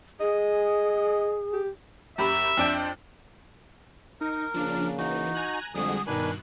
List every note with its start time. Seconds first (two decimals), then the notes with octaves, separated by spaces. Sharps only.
0.20 G#4 D#5
1.53 G4
2.18 F#2 G4 E5 B5
2.57 F2 D4 G5
4.21 D#4 A#4
4.54 C#3 F3 A#3 D4
4.98 E3 D#4 F#4
5.34 G#5 A#5 F#6
5.75 F2 D3 G3 G#3 F#4 G#4 D#6
6.07 G2 B2 D#3 D4 B4 G#5 F#6